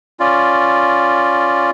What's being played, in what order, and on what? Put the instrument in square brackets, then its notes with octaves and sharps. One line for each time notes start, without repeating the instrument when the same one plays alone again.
[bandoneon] C#4 F4 D5